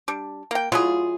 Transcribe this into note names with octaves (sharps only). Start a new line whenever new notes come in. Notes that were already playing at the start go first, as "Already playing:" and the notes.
G3 D4
A#3 G5
F#3 E4 F4 G#4